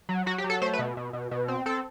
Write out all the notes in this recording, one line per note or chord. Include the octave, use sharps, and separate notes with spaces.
F#3
F#3 F#4
G4
F#3
A4
A3 C5
B4
B2
B2
B2
B2
C4
C4 A4